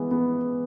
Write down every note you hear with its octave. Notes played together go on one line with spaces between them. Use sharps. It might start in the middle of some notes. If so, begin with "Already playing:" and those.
Already playing: E3 G#3 B3
B3